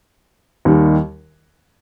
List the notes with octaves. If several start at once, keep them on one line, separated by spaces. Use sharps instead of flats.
D#2 D#3 G3